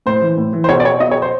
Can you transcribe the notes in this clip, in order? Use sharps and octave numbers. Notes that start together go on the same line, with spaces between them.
A2 C5
E3
A2
E3
C5
B2 C#5
D5
C#5
B2 D#5
C#5
C5